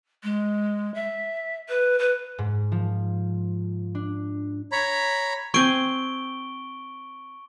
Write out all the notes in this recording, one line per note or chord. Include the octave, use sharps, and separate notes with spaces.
G#3
E5
B4
B4
G#2
F3
D4
C#5 A#5 B5
C4 G#5 C#6 D7 G7